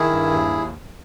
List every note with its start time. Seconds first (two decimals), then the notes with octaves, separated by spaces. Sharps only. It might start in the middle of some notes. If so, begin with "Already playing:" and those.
Already playing: D#3 E4 G#4
0.10 G2
0.31 D#2